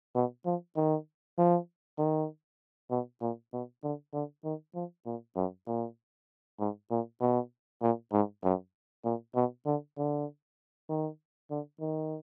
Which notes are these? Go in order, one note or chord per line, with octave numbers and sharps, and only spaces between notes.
B2
F3
D#3
F3
D#3
B2
A#2
B2
D3
D3
D#3
F3
A#2
F#2
A#2
G#2
A#2
B2
A#2
G#2
F#2
A#2
B2
D3
D3
D#3
D3
D#3